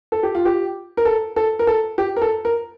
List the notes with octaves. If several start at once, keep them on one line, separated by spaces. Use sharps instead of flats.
A4
G4
F4
G4
A#4
A4
A4
A#4
A4
G4
A#4
A4
A#4